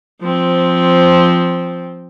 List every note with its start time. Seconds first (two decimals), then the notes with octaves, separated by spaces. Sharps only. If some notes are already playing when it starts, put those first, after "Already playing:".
0.21 F3 C4